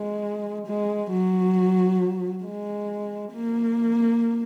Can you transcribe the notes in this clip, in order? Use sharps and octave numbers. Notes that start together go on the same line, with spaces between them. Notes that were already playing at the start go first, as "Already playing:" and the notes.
Already playing: G#3
G#3
F#3
G#3
A#3